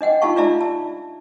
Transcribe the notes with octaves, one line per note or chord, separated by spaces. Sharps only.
D4 D#5 F#5 G5
D#4 F4 G4 F5 A5 C#6
D4 F4 D5 E5 A5 A#5
A5